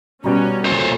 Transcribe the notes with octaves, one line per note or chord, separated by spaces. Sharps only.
B2 G3 C#4 F#4 A#5
A#2 A4 C5 C#5